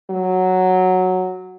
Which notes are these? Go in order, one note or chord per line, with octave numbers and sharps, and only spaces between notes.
F#3